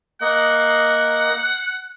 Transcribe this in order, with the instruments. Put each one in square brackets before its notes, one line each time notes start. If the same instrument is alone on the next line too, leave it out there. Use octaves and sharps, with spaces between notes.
[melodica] A#3 D#5 [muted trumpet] F#5